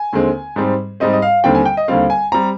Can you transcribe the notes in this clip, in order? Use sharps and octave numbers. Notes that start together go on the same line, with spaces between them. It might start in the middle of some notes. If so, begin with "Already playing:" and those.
Already playing: G#5
D#2 D3 G#3 C4
G#2 G3 C4
G#2 G3 C4 D#5
D#5
F5
D#2 D3 G3 C4 G5
G#5
G5
D#5
D#2 D3 G3 C4 F5
G#5
G3 C4 A#5